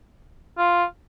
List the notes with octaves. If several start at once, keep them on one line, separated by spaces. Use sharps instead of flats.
F4